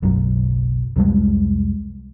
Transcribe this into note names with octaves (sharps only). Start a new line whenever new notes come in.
F#1 B1 F#2 F#3
C2 F2 G3 G#3